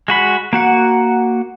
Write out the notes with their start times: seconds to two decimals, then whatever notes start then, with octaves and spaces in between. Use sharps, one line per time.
0.08 G#3 F#4 B5
0.53 A#3 F#4 F#5